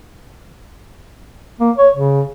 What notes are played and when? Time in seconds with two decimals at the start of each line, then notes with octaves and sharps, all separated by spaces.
1.60 A#3
1.77 C#5
1.96 C#3